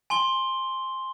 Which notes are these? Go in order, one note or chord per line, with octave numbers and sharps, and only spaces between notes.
G#5 C6 G7